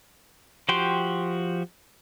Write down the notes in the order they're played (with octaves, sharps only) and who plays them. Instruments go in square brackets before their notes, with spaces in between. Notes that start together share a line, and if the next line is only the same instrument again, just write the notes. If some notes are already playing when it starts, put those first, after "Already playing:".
[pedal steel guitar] F3 F#4 G4 G5 C6